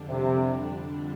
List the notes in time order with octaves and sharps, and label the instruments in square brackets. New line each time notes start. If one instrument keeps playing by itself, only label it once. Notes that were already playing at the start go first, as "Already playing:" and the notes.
Already playing: [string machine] F2 D3 G3 D4
[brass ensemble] C3